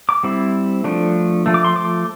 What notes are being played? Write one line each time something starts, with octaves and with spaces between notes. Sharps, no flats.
D6
G3 C4 E4
F3 A3 D4
F3 A3
D6
C6
D6